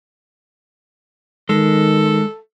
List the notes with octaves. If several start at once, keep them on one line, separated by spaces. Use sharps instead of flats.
D#3 G#3 A4